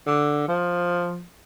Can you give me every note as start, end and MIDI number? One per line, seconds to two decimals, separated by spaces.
0.07 0.45 50
0.48 1.22 53